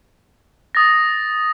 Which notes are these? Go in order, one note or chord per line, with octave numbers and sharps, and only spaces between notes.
D#6 A6 A#6